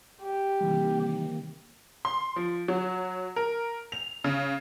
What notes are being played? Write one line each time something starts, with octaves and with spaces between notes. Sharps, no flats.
G4
C3 D#3 E3 G3 A#3
C6
F3
F#3
A#4
F7
C#3